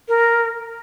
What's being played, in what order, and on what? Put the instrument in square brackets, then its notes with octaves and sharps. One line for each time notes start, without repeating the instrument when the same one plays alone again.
[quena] A#4